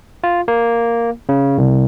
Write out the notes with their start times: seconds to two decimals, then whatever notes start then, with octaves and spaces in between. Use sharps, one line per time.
0.24 F4
0.48 A#3
1.29 C#3
1.58 C2